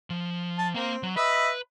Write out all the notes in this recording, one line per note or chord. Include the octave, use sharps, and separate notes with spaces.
F3
A5
A#3 C4 F5
F#3
B4 D#5 E5 B5